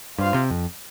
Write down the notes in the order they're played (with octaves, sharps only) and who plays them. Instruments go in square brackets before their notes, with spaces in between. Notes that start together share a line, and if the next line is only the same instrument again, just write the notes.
[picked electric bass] G2 [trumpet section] F4 C5 F5
[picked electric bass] C3
F2